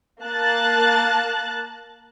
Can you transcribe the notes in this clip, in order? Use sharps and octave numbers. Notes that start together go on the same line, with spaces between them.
A#3 A5 F#6 A6